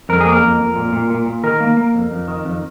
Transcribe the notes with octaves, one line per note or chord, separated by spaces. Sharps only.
F2 A#4
A#3 G#4
A#4
F2
F2
A#2
A#2
A#2
A#2
D#3 A#4
A#3
A#3
F2
F2
D#3
F2